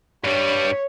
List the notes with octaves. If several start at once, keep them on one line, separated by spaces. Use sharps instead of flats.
G2 G3 C#5